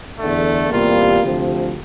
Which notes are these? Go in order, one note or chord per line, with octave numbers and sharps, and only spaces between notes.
E2 D3 A3
E2 C3 G3 A#3 F4
D2 C3 F3